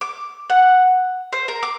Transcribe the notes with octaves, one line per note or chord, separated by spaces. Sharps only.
D6
F#5
C5
A#4
D6